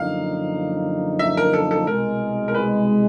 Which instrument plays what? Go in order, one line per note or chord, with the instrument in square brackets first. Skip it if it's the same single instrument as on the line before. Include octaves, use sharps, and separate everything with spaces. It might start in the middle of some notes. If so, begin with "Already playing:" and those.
Already playing: [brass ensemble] F#2 D3 F3 A#3 D#4 [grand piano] F5
[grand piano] E5
A#4
A4
A4
[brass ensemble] C2 B2 G#3 [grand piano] A#4
[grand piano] A#4
B4